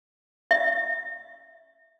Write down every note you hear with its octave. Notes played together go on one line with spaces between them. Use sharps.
E5